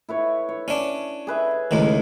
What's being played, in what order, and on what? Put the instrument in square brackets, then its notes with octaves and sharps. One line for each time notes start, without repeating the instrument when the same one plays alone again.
[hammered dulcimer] E4 B4 C#5
C#5
[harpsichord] C#4 D4
[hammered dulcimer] G#4 B4 E5
[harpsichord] C#2 A2 D#3